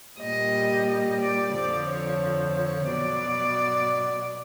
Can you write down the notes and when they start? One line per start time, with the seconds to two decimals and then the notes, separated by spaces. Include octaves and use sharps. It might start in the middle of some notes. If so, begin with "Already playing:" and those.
0.21 A#2 G3 D#5
0.87 D#5
1.21 D5
1.55 F2 D3 F3 D5
1.88 C#5
2.56 C#5
2.89 B2 F#3 D5